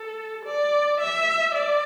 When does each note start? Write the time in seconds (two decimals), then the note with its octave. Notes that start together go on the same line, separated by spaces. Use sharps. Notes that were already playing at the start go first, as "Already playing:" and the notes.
Already playing: A4
0.45 D5
1.00 E5
1.55 D5